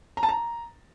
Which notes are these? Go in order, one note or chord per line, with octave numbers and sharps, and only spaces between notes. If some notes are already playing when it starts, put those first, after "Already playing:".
A#5
A5
A#5